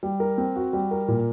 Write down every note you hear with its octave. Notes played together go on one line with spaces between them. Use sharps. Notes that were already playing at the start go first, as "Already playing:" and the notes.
G3
A#4
C4
F#4
G3
A#4
A#2